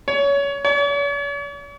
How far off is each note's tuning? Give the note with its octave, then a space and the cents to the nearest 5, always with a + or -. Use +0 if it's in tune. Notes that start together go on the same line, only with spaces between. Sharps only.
C#5 +25
C#5 +45